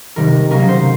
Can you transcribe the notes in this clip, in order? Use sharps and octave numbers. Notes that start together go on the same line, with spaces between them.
C3 D#3 G3 A#4
C#3 F#3 A#3 C#4 A#4
C5